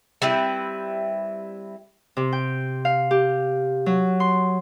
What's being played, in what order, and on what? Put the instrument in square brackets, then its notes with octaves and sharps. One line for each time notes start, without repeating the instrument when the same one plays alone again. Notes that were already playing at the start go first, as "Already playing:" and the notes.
[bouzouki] G3 C4 E4 B4
[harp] C3
G5
F5
G4
F#3
C6